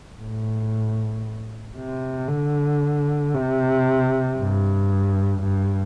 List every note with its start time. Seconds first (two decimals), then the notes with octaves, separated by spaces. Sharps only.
0.20 A2
1.77 C3
2.29 D3
3.34 C3
4.39 G2
5.43 G2